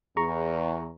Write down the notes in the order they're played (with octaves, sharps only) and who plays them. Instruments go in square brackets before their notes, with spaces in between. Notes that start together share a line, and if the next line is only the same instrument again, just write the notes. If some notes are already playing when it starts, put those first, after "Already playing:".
[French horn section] E2 [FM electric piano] G#4 A#5 C#6